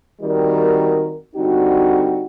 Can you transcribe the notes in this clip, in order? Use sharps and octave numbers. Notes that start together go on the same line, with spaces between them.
D#3 G3 C4 F#4 A#4
D3 G3 C4 D#4 F#4